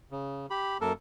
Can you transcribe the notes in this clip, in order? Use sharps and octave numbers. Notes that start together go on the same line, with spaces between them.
C#3
G4 B5
F#2 A#3 A4 A#4